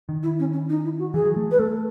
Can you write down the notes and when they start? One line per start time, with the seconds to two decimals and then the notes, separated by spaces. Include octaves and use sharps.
0.09 D#3
0.23 E4
0.39 C#4
0.53 C#4
0.69 D#4
0.84 E4
0.99 F#4
1.14 E3 G#4
1.25 F#3
1.37 A3
1.51 B4
1.59 A3 A4